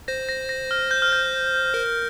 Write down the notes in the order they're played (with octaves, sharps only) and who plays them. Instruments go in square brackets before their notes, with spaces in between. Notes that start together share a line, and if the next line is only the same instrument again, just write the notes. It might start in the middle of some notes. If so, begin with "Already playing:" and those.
[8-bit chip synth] C5 [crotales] A#6
[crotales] A#6
A#6
F6
G6
F6
G6
[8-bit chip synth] A#4